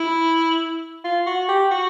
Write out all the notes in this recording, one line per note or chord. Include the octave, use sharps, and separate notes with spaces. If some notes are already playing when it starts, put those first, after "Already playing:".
Already playing: E4
F4
F#4
G4
F#4